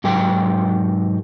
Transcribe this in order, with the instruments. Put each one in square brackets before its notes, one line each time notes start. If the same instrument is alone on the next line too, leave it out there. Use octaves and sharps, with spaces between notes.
[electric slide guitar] G#2 F#3 G4 A#4 G5